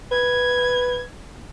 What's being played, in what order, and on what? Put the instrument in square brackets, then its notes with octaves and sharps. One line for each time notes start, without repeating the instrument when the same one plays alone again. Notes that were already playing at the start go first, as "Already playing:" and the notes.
[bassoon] B4 [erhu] G#6